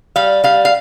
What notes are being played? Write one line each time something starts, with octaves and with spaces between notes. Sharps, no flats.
G3 F5
G3 F5
F5